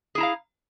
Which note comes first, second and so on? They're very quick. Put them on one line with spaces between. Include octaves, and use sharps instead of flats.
G#4 E4 A#5 F5